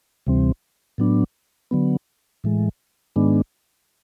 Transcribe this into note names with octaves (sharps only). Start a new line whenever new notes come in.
D2 C3 E3 G3 C4
A2 F#3 B3 D4
D3 F#3 B3
A2 E3 G#3
G#2 D#3 G#3 B3 D4